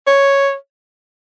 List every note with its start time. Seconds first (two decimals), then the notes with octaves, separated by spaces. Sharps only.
0.07 C#5